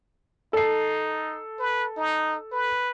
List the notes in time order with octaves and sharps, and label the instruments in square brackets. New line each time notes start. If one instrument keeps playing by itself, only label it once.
[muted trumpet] D#4 [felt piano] A4 C7
[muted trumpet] B4
D#4
B4